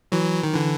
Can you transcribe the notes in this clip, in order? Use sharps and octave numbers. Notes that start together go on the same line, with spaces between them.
E3 F#3
D#3
D3 E3